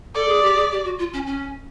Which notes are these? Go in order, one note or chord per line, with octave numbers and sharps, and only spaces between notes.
A4 D5
G#4
G4
G#4
G4
F#4
F4
C#4
C#4